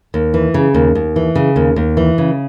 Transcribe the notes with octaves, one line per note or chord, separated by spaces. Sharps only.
D#2
E3
C#3
D#2
D#2
E3
C#3
D#2
D#2
E3
C#3